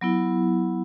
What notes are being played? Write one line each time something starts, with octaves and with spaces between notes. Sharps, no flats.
F#3 B3 E4